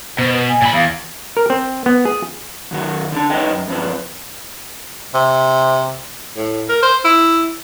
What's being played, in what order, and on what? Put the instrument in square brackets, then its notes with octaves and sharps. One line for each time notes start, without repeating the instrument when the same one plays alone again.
[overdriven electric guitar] B2 [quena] C5
[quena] B4
G#5
[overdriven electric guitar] A#2 B5
[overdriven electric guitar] E2 [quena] F5
[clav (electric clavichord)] A#4
C4
B3
G#4
[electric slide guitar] F#2 D#3 F#4
D3 D4 A5
G3 D#4 B4 C#5 D#5 G5
F#2
G2 F3 C4 B4
[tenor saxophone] C3
A2
A#4
C5
E4